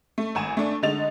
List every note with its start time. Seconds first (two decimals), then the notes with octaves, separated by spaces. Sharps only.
0.18 A3
0.35 G#1 G#5 E7
0.57 A3 D4
0.83 D3 G#3 D#4 A6 F7